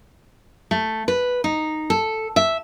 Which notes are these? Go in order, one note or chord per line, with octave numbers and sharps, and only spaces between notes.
A3
B4
D#4
A4
E5